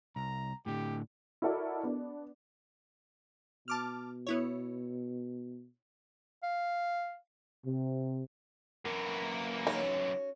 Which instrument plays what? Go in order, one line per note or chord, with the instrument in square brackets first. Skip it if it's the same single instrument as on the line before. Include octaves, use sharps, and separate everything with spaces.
[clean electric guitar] C2 [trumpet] A#5
[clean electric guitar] A2 D3 [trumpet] G4
[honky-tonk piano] E4 F#4 A4 A#4 D5 D#5
B3 D4
[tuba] B2 [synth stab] A5 D6 F6
[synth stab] B3 E4 C#5
[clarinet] F5
[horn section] C3
[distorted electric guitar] F#2 E3 [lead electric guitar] A#3 A#4
[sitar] C#4 F#4 C#5 [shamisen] D#4